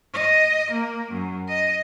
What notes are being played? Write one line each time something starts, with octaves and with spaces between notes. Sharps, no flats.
D#5
A#3
F#2
D#5